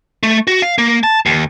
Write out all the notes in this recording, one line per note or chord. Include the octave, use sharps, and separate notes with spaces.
A3
F#4
F5
A#3
A5
D#2